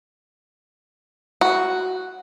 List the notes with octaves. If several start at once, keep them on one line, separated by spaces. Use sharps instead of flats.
F#4